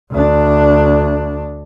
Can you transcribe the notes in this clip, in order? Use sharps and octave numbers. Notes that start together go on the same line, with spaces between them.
D2 D4